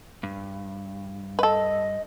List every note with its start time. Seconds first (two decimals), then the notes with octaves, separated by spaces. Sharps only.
0.23 G2
1.39 A4 B4 D#5